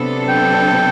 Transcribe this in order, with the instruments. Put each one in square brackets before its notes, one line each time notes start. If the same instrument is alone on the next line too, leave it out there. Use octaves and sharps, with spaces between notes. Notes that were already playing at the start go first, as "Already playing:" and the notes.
Already playing: [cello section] C3 F#3 B3 D4 A4
[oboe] G5